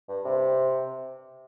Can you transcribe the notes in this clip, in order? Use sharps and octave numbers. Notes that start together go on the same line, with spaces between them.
G2
C3